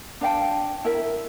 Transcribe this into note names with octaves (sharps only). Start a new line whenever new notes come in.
D4 F5 G5 A5
E4 A#4 E5